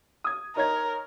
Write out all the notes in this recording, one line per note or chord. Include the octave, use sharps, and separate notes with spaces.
D#6 G#6
D#4 A#4 C#5 G#6